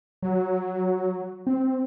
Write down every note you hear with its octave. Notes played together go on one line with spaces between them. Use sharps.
F#3
C4